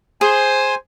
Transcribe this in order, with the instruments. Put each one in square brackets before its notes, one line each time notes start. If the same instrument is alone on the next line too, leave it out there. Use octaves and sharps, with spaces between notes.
[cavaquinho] G#4 [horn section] C5 [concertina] G#5